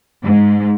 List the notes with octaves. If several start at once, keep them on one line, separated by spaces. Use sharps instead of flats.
G#2